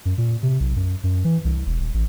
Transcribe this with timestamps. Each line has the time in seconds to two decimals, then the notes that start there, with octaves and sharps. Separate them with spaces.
0.05 F#2
0.18 A#2
0.43 C3
0.60 B1
0.76 F#2
1.04 F#2
1.24 E3
1.45 C2
1.67 E1
1.80 D#1
1.94 A1